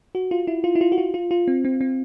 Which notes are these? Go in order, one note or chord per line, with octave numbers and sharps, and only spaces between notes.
F#4
F4
E4
F4
E4
F4
F#4
F4
F4
F4
C4
C4
C4